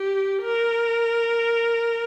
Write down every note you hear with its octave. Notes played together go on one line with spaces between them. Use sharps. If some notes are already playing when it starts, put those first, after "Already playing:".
Already playing: G4
A#4